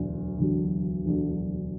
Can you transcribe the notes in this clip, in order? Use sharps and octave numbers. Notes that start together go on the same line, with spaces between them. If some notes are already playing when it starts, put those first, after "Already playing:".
Already playing: E1 D2 D3 F#3
E1 D2 D3 F#3
E1 D2 D3 F#3